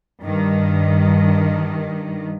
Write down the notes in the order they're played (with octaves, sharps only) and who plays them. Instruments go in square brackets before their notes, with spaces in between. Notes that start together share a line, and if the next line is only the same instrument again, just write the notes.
[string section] G2 D#3